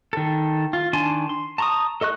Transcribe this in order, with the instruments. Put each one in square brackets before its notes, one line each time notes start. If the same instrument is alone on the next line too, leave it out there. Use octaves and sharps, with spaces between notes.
[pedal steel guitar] D#3 A4
F4
D#3 D4 G#5 A5 C6
C6
A5 A#5 C6 C#6 D#6
A4 D#5 C#6 F#6